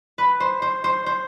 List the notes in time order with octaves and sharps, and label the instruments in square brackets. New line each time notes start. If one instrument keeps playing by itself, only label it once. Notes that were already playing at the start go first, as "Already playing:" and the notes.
[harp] B4
C5
C5
C5
C5